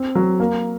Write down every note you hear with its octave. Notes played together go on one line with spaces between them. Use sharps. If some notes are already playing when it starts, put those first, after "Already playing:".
Already playing: C4
F#3
A#3